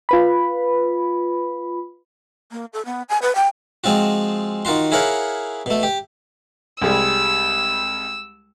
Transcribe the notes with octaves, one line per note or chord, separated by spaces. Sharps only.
F4 B4 B5
A#3
A4
B3
G#5
B4
G5
F3 G#3 C4 F4 F#4
D#3 F4 F#4 C6
E4 G#4 A#4 C#5 F5 F#5
B2 A3
G4
C2 G3 G#3 E6